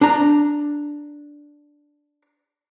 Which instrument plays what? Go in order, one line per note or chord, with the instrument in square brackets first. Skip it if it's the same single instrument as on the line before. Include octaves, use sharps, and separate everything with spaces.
[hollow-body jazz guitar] D4 A#5